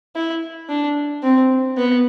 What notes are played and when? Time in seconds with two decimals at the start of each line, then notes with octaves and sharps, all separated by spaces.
0.16 E4
0.69 D4
1.23 C4
1.77 B3